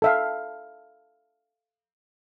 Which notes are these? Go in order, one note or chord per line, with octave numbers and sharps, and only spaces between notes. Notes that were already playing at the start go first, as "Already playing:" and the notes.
A4 E5 F5